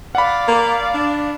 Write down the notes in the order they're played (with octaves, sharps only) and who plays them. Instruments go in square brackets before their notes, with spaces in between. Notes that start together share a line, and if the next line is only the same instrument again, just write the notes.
[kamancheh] D5 F5 [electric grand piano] F#5 B5
[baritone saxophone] A#3
D4